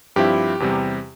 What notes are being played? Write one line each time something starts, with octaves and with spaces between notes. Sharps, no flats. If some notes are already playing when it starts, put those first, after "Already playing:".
G2 F3 C4 E4 G4
E2 C3 G3